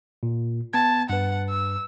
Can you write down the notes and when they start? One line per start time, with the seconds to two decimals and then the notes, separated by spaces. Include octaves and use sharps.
0.23 A#2
0.73 B3 A5 G#6
1.09 G2 B4 F#5
1.49 E6